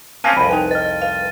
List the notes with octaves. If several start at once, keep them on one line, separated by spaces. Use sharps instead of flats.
A#3 C4 C#4 F5 G#5 A5 D#7
C2 F2 B5
D#4 B4 G5 G#5
D#5 F6 A6
B4 F5